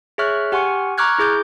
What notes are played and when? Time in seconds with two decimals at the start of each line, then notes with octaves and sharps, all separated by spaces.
0.18 G#4 C#5 E5 C#6 F6 F#6
0.52 G4 F#5 G#5 C6 C#6 F6
0.98 A#5 C#6 D6 F6 F#6 G#6
1.18 E4 G#4 D6 G6